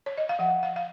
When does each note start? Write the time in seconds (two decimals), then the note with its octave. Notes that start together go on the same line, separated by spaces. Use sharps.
0.06 C#5
0.17 D#5
0.29 F5
0.39 F3 F#5
0.63 F5
0.76 F5